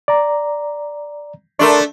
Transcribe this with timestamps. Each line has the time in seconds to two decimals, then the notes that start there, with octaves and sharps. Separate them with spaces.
0.08 D5 A#5
1.59 A3 D4 A#4 C6 C#6